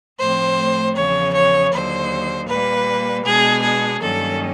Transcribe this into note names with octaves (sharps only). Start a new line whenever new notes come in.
A2 F3 A3 C4 C5
E2 C#3 F3 C#5
C#5
D#2 D3 F#3 C5
A#2 G3 A#3 B4
B2 G#3 B3 D4 G#4
G#4
G2 D#3 F#3 A#3 C#4 A4